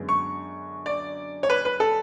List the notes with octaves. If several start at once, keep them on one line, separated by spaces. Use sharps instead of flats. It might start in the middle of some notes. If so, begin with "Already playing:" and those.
Already playing: F#2 D3 G#3 B3
C#6
D5
C#5
B4
B4
A4